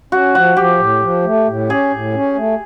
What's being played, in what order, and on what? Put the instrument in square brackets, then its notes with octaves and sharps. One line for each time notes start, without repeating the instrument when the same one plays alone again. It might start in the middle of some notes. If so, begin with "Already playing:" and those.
[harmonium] C#4 [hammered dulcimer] F#4
[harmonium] F3 [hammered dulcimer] F#4
[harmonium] F3 [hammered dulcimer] G4
[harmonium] A2
F3
A3
A2
[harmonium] C#4 [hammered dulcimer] G#4
[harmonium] A2
C#4
A3